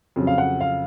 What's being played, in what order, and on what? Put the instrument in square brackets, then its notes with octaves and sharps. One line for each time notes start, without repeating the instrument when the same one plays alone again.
[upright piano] F2 C#3 F#3
F5
F#5
F5